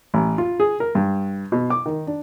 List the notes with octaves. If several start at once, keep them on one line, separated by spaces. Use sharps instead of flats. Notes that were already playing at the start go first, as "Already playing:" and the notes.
A1
F4
G#4
A#4
G2
B2
D6
D#3
D4